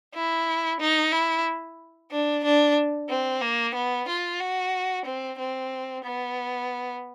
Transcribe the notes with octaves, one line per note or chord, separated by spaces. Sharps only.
E4
D#4
E4
D4
D4
C4
A#3
B3
F4
F#4
C4
C4
B3